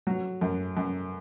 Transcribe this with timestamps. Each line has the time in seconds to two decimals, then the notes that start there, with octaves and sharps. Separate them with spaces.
0.07 F#3
0.41 F#2
0.77 F#2